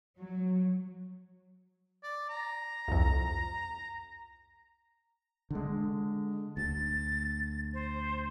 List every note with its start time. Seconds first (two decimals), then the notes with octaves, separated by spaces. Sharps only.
0.17 F#3
2.03 D5
2.29 A#5
2.88 C2 F2
5.51 D3 G#3
6.57 D2 A6
7.74 C5